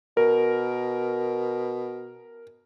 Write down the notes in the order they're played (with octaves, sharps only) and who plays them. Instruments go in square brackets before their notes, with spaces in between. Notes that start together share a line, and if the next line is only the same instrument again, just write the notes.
[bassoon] B2 [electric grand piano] A#4